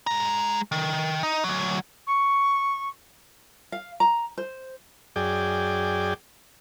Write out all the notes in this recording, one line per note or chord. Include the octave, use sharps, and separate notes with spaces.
G#3 A#5
D#3
D#4
D2 F#3
C#6
F5
A#5
C5
F#2 G#4 D5 G5